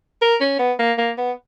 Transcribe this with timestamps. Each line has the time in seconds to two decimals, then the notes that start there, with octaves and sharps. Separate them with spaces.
0.22 A#4
0.41 C#4
0.59 B3
0.79 A#3
0.98 A#3
1.18 B3